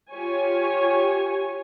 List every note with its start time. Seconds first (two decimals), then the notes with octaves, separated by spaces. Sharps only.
0.10 F4 G4 C#5 G#5